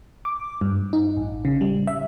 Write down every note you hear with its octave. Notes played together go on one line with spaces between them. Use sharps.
D6
G2
D#4
A1
C#3
G3
E5